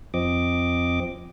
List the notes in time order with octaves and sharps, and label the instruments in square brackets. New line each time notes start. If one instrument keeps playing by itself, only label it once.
[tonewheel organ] F2 F3 C4 D#5 D6